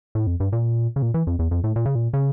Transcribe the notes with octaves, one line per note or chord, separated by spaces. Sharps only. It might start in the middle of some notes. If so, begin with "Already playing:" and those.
A2
F2
G2
A#2
C#3
A#2
E3
F2
E2
F2
A2
A#2
C#3
A#2
C#3